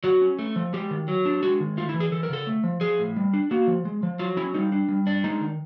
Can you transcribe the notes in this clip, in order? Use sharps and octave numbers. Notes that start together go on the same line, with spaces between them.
F#3 F#4
C#4
A3
F3
G#3 G4
D#3
F#3
D4
G#3 F#4
D#3
A3 F4
E4
E3
G#4
E3 A4
A#4
C#3 A4
A3
F3
F3 G#4
A2
G3
D4
A#3 F#4
F3
G#3
F3
F#3 F4
C#4 E4
G3 D#4
D4
G3
D4
G#3 D#4
D#3